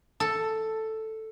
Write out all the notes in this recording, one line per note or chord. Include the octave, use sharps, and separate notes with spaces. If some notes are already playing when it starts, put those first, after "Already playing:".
A4